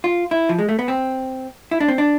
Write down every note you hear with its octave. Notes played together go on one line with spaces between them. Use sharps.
F4
E4
F3
G#3
A3
B3
C4
E4
D4
C4
D4